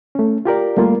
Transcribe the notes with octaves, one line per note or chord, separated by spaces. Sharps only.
A3 C#4
F4 G4 A#4 D5
G3 A3 A#3 F4